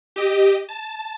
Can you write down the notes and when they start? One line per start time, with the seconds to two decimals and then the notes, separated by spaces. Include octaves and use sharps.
0.16 G4 D#5
0.69 A5